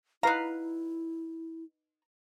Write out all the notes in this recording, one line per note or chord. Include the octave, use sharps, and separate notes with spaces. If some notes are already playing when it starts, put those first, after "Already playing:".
D#4 E4 B4 F5 A#5